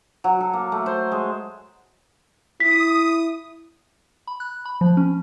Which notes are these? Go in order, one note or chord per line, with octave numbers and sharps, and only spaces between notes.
F#3
A4
A#3
A3
C5
G#3
E4 D#6 B6
B5
F#6
B5
F3
C#4